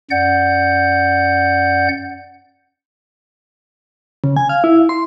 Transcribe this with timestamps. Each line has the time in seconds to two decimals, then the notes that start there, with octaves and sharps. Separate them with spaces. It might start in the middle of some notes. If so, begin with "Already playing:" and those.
0.11 F#2 D5 F#5 G6
4.24 C#3
4.37 G#5
4.49 F5
4.64 E4
4.89 C6